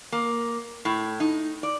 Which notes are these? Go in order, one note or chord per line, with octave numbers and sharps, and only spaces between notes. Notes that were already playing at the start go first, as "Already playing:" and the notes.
A#3
A2
D#4
D5